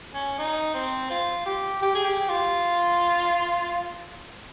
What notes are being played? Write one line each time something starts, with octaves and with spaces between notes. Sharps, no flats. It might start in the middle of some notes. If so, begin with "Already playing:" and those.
C#4
D#4
C4
F4
G4
G4
G#4
G4
F4